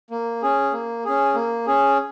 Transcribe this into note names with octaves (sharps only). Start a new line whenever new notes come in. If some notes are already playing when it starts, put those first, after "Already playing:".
A#3
C#4 G#4
A#3
C#4 G#4
A#3
C#4 G#4